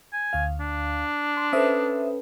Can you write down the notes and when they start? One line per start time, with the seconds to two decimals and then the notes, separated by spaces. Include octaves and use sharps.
0.13 G#5
0.33 D2 F5
0.60 D4
1.37 C6
1.53 C#4 A4 B4 C5 E5 D#6